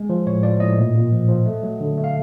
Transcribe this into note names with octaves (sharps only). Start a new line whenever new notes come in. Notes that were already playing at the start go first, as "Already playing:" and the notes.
Already playing: G#3
F3
A2 C#5
F3 D5
A2 D#5
A#2
A#2
F3
F3
A3
F#3
D3
A3
F5